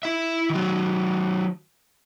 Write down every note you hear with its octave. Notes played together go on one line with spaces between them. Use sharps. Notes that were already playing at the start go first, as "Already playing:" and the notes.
E4 E5
D#3 F#3